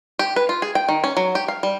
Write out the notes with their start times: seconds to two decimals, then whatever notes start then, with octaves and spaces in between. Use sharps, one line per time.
0.19 G4
0.36 B4
0.49 F4
0.62 G#4
0.75 G5
0.89 D#3
1.04 C#4
1.17 F#3
1.35 G4
1.48 F5
1.63 G3